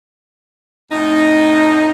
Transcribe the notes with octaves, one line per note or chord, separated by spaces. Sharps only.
F2 A2 D#4